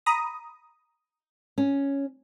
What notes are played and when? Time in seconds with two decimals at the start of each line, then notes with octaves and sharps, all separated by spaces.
0.06 A#5 B5 D#6
1.58 C#4